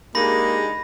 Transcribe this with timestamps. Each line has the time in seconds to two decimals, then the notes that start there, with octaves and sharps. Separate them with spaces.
0.15 G#3 A#3 D4 D#4 G4 G#4 B5 A#6